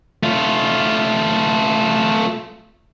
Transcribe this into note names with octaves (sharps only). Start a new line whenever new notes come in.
A3 F4